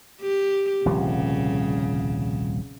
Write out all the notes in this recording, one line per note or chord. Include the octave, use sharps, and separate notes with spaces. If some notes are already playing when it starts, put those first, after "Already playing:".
G4
D#1 C2 C#3 F3